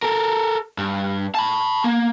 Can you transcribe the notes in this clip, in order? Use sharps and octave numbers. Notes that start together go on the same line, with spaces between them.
A4 A#4
G2
A5 B5
A#3